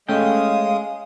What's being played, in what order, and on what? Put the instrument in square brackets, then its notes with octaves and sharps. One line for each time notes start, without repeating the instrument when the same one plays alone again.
[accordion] G#3 D#6 [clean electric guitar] A3 C#4 G5 [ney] F5